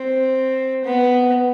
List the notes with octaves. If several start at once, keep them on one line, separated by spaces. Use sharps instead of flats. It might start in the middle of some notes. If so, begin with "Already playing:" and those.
Already playing: C4
B3